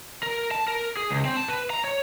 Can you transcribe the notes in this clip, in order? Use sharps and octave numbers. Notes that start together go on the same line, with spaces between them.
A#4
A5
A#4
G#4
C#2
C4
A5
B4
A#5
C#5